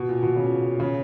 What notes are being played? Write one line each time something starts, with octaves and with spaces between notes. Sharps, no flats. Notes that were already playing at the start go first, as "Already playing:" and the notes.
Already playing: B2
A#2
B2
C#3
C#3